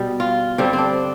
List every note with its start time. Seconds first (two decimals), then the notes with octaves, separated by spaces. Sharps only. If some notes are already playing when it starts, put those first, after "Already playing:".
Already playing: B2 G3
0.20 F4
0.58 G2 D3 G3 C4
0.73 C4 D4